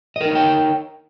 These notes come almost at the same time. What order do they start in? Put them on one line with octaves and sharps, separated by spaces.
D#5 A#4 D#4 C#5 G5